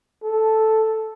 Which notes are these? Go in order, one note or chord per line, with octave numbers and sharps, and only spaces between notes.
A4